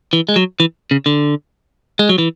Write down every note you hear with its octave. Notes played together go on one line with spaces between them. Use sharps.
E3
G#3
F#3
E3
C#3
D3
G#3
F#3
E3